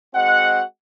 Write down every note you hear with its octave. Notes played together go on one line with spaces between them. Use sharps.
G#3 C4 F#4 D#5 F#5